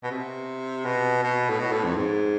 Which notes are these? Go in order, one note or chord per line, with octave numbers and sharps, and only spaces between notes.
B2
C3
B2
B2
A2
B2
A2
F2
G#2